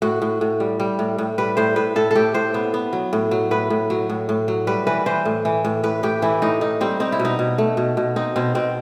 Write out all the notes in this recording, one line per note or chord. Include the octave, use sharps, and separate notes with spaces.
A2 F#4
A2
A2
G3
G3
A2
A2
G3 B4
A2 C5
A2 B4
A2 A4
A2 G4 A4
A2 C5
B3
B3
F#3
A2
F#3
A2 B4
A2
F#3
A2
A2
F#3
G3 B4
E3 B4
E3 C5
A2
E3
A2
A2 B4
A2 G4
E3 E4
A2 D#4
A2 D#4
G3 C4
C4 D#4
E4
B2
D#4
B2
A3
B2
B2
C4 D#4
B2 C4
B2 C4